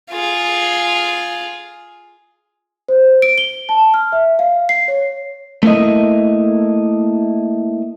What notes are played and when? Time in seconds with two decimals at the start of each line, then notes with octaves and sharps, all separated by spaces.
0.11 F4 G#4
2.89 C5
3.22 D7
3.38 G7
3.69 A5
3.94 F6
4.12 E5
4.39 F5
4.69 C7
4.88 C#5
5.63 A3 A#3 E4 D#5